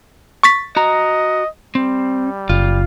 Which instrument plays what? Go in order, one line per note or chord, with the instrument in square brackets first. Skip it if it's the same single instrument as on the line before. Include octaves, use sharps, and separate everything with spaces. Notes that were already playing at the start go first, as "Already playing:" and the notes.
[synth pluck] C#6 A6 B6
[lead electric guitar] F#4 A#5 [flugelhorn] D#5
[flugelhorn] G3 [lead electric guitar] C4
[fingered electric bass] F#1 [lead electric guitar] F4